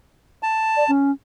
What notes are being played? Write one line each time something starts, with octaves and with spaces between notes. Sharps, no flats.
A5
D5
C#4